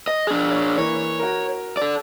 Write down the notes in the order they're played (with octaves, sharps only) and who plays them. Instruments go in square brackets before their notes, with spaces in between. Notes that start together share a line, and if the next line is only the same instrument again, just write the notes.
[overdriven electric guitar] D#5
D4 G#4
[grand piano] C#5 D5
[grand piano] E3 A#3 [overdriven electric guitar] C#5
[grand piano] F#4 A#4
[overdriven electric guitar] A4 D5